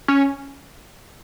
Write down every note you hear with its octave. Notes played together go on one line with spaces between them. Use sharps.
C#4